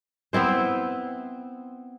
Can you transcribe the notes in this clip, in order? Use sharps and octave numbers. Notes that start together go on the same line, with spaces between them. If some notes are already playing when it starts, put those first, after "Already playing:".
B3 C4 E4 C5